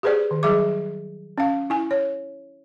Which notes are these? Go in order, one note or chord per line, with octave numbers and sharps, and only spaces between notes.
G4 G#4 B4 C5 D5
D#3
F#3 G3 G#4 E5 D6
C#4 F5
E4 G#5
C#5